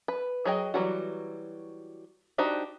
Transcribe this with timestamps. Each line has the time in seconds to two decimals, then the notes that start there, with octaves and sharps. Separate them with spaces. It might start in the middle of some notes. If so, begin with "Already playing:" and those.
0.08 B4
0.45 F#3 G#4 D#5 G5
0.74 E3 F#3 G3 F#4
2.38 D4 D#4 F#4 G4 C5